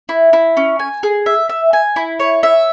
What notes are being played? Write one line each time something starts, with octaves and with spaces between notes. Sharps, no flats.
E4
E4
C#4
G#5
G#4
E5
E5
G#5
E4
C#5
E5